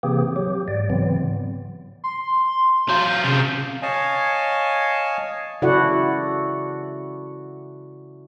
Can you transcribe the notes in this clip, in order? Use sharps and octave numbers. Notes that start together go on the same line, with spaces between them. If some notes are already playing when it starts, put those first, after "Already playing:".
C3 E3 A#3 C4 G4 G#4
F#3 G4
G#2 D5
G#2 C#3 E3 F#3 B3 C4
C6
F#3 F4 G6
C2 C#3
C#5 D#5 F5 G#5 A5
C#3 E4 F#4 A4 D5 F#5